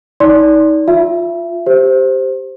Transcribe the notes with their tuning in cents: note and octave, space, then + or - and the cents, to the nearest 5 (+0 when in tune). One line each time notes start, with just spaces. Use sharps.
D#4 +30 D5 -25 C6 +10
F4 +0 E5 +30
G4 +0 C5 +0